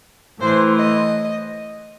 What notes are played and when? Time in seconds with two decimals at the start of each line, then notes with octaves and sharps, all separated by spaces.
0.40 A2 E3 C5
0.75 D#5